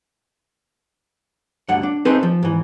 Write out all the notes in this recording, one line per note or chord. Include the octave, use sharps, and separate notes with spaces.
D2 G2 D3 F#5
D4
C4 D#4 G#4 A4 B4 C5
F3
G#2 E3